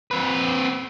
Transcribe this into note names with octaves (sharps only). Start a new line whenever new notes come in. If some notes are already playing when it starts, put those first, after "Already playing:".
C4 B4